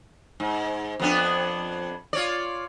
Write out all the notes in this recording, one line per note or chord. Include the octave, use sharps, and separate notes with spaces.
G#2
F2 B3 D4
F4 C#5 D5